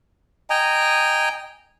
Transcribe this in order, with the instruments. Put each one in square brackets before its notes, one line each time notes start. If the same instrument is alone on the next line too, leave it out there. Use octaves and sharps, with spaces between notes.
[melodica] D#5 G5 G#5 A#5